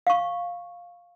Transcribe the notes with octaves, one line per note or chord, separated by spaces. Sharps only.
F5 C#6